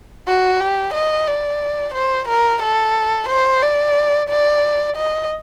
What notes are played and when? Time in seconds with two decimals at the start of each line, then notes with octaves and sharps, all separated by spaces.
0.27 F#4
0.60 G4
0.94 D#5
1.28 D5
1.94 C5
2.28 A#4
2.62 A4
3.29 C5
3.62 D5
4.29 D5
4.97 D#5